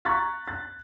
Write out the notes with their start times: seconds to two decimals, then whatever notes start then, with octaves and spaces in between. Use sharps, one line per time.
0.05 A#5 C#6 F#6 G#6 A6 B6
0.48 F#6 A6